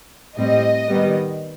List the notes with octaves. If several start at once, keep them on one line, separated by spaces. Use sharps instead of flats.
A2 G3 C4 D#5
D#3 G3 B3